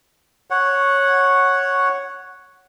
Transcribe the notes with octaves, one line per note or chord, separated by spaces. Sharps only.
C#5 F#5